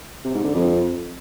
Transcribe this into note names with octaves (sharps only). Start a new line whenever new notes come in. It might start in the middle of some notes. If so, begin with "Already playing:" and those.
C3
G#2
D3
F2